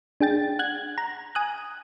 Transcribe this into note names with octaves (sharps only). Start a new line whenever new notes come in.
D4 G#4 G5 A6
F#5 F#6 G#6
A#5
G#5 D#6 F#6